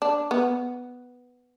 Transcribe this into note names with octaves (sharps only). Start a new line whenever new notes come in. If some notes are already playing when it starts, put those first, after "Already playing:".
D4
B3